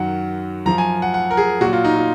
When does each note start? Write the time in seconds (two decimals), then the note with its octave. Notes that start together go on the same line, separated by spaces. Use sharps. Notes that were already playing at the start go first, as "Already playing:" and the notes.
Already playing: F#2 D#3 F#3 F#5
0.66 F#2 F3 A#5
0.78 G#5
1.02 F#5
1.14 F#5
1.31 A#4
1.37 G#4
1.61 A#2 F#4
1.66 F#3
1.73 F4
1.85 D#4
1.96 F4